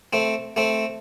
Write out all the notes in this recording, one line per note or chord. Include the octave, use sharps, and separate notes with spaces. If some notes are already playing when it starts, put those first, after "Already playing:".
A3 C4
A3 C4